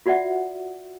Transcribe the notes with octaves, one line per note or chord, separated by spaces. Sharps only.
F4 F#4 D5 E5 F#5